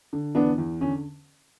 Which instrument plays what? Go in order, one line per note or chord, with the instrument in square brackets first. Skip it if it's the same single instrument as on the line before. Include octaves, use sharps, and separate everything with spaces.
[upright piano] D3
E2 B3 D4
E2
D3 C#4